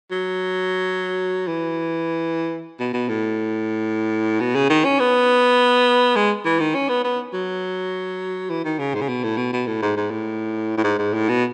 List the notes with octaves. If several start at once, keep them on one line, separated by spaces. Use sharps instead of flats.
F#3
E3
B2
B2
A2
B2
C#3
D#3
C#4
B3
G#3
E3
D#3
C#4
B3
B3
F#3
E3
D#3
C#3
G#2
C#3
B2
A2
B2
B2
A2
G#2
G#2
A2
A2
G#2
G#2
A2
B2